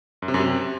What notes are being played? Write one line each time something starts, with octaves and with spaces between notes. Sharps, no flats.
F#2
C3
F#2
C3